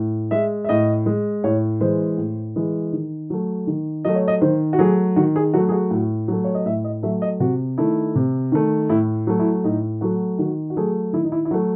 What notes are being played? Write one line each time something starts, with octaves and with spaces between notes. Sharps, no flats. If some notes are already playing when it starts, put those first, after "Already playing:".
Already playing: A2
G#3 E5
E5
A2 D#5
G#3
A2 C#5
E3 G#3 C5
A2
E3 G#3
D#3
F#3 A3
D#3
F#3 A3 D#5
C#5
D#5
D#3 C5
F#4
F#3 A3 G#4
D#3 F#4
G#4
F#3 A3 F#4
G#4
F#4
A2
F#3 A3
C#5
D#5
A2 E5
D#5
F#3 A3 E5
D#5
C3 F#4
D#3 A3 E4
C3
D#3 A3
A2 E4
F#3 A3
E4
A2 D#4
F#3 A3 F#4
D#3 F#4
F#4
F#3 A3 G#4
D#3 E4
D#4
E4
E4
F#3 A3 F#4